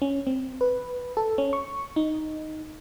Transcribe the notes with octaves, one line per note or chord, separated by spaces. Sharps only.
C#4
C4
B4
A4
C#4
C#6
D#4